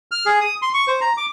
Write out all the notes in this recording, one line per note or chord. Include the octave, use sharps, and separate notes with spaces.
F6
G#4
D#6
C6
C#6
C5
A#5
D6